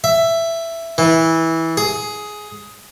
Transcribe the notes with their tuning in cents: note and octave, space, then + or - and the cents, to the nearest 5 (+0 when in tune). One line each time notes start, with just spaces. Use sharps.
E5 +10
E3 -15
G#4 +10